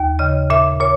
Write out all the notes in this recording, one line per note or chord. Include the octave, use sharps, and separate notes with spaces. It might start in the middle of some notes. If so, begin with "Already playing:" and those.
Already playing: D#2
C#3 D#5
A#2 E5
A#2 C#5